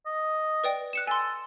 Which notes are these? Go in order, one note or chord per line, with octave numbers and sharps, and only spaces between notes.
D#5
B4 D5 G5
F#6 C#7 E7
A4 G#5 C6